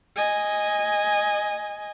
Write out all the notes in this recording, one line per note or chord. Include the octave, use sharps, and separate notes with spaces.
D#5 G#5